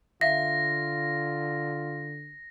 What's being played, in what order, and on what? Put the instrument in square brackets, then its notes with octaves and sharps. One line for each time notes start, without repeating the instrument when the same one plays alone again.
[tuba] D3 [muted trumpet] F4 [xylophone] E5 F5 [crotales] A#6